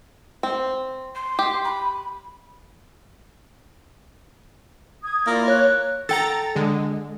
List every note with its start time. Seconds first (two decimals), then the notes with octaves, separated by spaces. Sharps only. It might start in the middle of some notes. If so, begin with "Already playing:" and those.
0.43 C4
1.15 C6
1.39 G4
1.65 B5
5.03 D#6 G#6
5.27 A#3 E4 F4 D5
5.48 C#5 F#6
6.09 A4 G5 A#5 A6
6.55 D3 G#3